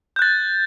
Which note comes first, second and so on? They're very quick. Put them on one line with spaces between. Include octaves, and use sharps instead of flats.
G6 F#6 A6